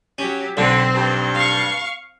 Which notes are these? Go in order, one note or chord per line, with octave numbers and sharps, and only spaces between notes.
F#3 C#4 G4
B1 D3 C4
G2
F5 C#6